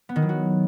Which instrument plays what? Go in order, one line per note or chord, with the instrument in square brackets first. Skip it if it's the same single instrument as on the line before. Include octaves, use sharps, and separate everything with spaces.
[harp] B3
D#3
F#3
F#4